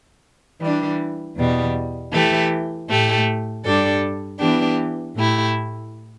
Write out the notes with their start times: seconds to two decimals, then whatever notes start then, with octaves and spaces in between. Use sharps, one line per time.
0.61 E3 G3 D4
1.36 E2 B2 G3
2.12 E3 A3 G4
2.89 A2 A3 G4
3.64 G2 G3 D4 A4
4.40 E3 B3 D4 G4
5.16 A2 A3 E4 G4